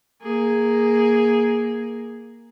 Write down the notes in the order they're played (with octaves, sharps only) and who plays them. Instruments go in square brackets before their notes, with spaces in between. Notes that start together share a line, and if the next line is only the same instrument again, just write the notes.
[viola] A#3 G#4